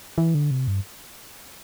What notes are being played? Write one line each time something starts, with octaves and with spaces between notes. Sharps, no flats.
E3
D3
C3
G2